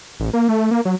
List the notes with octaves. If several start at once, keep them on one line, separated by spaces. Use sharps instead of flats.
A1
A#3
A3
A#3
F#3